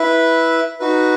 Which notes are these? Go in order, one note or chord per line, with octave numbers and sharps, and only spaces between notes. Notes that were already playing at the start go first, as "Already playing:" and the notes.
Already playing: E4 B4 E5
D#4 F#4 B4